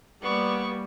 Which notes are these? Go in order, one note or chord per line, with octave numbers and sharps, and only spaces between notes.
G3 A#3 B3 D5 C#6